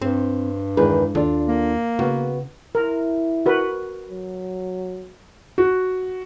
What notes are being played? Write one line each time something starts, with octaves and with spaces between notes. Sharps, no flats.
G2 C4 C5
E2 D#3 G#3 B4
D#2 D4 F4 A4
A#3
C#3 B3 F#4
E4 A#4
F#4 A#4 B4
F#3
F#4